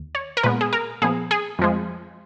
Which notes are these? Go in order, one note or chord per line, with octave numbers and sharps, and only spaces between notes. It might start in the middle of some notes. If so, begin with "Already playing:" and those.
Already playing: D#2
C#5
A#4
A#2 G#3 B3 B4
G#4
A#4
A#2 F3 B3 G#4
G#4
F2 F3 G#3